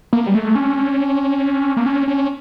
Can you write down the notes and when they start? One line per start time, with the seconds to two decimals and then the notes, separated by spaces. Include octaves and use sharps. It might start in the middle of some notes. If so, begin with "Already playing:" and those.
0.13 A#3
0.27 G3
0.35 A3
0.55 C#4
1.77 A#3
1.86 C#4
2.07 C#4